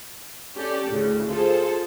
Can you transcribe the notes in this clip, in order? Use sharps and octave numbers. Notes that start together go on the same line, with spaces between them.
C#4 G4 A4 D5
D2 A2 C#3
F4 G#4 A4 C5